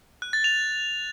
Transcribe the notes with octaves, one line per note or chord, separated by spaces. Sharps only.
F#6
A6
F7